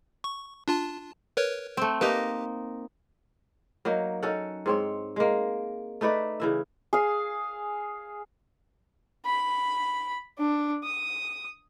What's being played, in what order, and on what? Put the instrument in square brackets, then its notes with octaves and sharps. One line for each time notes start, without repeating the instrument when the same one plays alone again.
[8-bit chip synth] C#6
D4 F4 A5
A#4 B4 C#5
[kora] A3 C4
[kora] A#3 D#4 [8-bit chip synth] G4 B4
[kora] F#3 A#3 D#4
C#4 D#4 A4 F#5
G#2 C4 C#5
G#3 A#3
A3 D#4 B4 D5
C#3 E3 E5
[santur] G#4 F5
[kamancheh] B5
D4
D#6